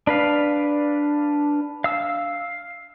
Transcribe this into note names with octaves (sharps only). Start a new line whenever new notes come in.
D4 B4 F5
F5 E6